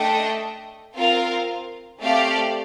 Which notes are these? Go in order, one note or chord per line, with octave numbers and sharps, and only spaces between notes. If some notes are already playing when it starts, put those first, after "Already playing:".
Already playing: A3 D4 A4 D#5 G5
C4 F4 A#4 F5
A3 C4 G4 D5 F5